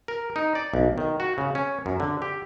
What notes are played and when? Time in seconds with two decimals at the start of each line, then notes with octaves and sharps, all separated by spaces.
0.08 A#4
0.36 D#4
0.55 D5
0.74 B1
0.98 D#3
1.20 F#4
1.38 C#3
1.55 C#4
1.86 F#2
2.00 D3
2.22 G4